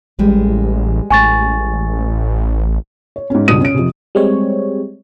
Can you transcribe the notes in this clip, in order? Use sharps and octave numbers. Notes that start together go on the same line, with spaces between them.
A1 G3 G#3 B4
A1 G#5 C#6 A6
C#5
G#2 C#4
C#2 G2 B2 D#6 D#7
C#4 D7
F2 C3
G3 G#3 C4 C#5